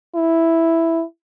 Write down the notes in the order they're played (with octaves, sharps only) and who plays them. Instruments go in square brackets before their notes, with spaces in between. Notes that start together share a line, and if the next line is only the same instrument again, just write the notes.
[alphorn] E4